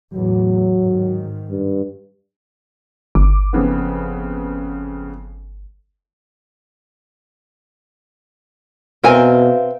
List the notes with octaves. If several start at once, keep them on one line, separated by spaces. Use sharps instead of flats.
E2 A2 F#3
G#2 D#3
G2
G1 D6
F2 C#3 B3
B2 C4 A#4 B4 E5 F5 G#5